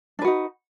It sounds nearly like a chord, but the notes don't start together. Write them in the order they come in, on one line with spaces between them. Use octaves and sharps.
D4 B4 F#4 D#4